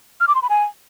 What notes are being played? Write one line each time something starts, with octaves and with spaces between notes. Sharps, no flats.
F6
D6
C6
B5
G#5